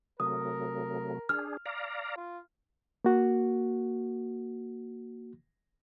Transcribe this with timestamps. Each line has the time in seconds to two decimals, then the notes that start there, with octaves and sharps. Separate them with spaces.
0.20 C3 F#3 A3 A#4 D#6
1.29 D4 G#4 F6
1.66 D5 F5 A#5
2.17 F4
3.05 A#3 F#4